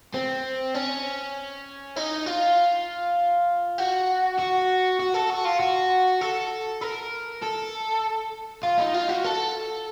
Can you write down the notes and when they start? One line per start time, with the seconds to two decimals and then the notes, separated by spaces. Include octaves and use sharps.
0.14 C4
0.75 C#4
1.96 D#4
2.26 F4
3.78 F#4
4.39 F#4
4.99 F#4
5.14 A4
5.30 F#4
5.45 F4
5.60 F#4
6.21 A4
6.81 A#4
7.42 A4
8.63 F4
8.78 D#4
8.94 F4
9.09 F#4
9.24 A4